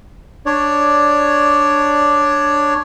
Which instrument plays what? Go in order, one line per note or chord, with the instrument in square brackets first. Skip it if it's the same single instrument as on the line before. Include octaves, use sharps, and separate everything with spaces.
[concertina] D4 C#5 D5